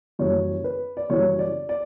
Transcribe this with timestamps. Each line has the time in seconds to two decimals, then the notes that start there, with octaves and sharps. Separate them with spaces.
0.19 F#1 F#2 E3 G3 C#5
0.64 B4
0.97 D5
1.10 F#1 F#2 E3 G3 C#5
1.39 D5
1.69 D5